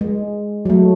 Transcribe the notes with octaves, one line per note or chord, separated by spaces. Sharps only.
G#3
F#3 A3